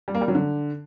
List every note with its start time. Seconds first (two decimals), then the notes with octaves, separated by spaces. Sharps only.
0.08 G3
0.15 A#3
0.21 G3
0.28 F#3
0.35 D3